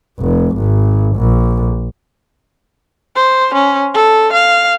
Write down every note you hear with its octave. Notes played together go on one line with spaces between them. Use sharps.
F1
G#1
A#1
C5
C#4
A4
F5